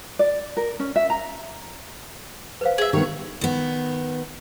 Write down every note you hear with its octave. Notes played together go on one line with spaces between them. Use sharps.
D5
A#4
C#4
E5
A#5
B4 C5 F5
G#4 E5
D#3 B3 G4 C#5
D#3 B3